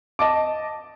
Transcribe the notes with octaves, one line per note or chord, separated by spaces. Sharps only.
D#5 A5 D6